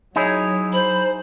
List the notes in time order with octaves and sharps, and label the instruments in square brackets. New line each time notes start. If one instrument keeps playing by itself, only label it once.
[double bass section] F#3 [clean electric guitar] D#4 E4 G#4 [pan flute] C#5
[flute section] C5 [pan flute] B5